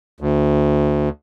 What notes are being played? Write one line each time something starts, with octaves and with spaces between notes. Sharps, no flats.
D2